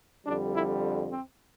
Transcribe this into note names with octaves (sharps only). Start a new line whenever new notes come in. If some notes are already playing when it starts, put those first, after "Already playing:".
F2 D3 G3 D4
E4
C4